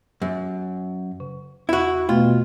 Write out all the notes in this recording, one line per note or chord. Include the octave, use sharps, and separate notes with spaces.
F#2
C#3
E2 E4 F#4
B2 A3 F4